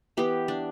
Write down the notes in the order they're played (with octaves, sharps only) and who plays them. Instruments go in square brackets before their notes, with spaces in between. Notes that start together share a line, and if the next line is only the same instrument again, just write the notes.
[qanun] E3 B3 G4
D4